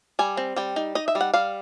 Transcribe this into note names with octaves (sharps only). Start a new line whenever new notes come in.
G3 G#5
C4
G3 G5
D#4
D#4 D#5
E5
G3
F#5
G3 F5